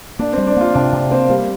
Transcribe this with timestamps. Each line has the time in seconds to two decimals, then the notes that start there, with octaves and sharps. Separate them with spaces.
0.19 A#3 D4
0.33 G3 C4
0.47 D4
0.57 A#3 F4
0.74 C3 D4
0.93 C3
1.11 A#3 C4
1.29 G3 A#3